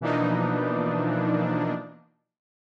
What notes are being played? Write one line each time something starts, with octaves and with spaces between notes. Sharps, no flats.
B2 E3 F3 A#3 D4 D#4